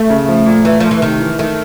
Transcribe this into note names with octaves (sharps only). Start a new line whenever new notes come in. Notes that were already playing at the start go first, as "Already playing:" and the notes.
Already playing: A3
C#3
F3
A#2
E3 A3
F3 A3
E3
C3 D#3
E3
D#3 A3